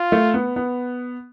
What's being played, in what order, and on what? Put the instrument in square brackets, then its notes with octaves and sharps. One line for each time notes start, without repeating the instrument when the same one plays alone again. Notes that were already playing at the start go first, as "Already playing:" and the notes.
Already playing: [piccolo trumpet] F4
[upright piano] A3
B3
B3